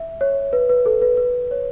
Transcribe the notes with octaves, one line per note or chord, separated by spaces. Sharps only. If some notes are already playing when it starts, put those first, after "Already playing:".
Already playing: E5
C#5
B4
B4
A4
B4
B4
C#5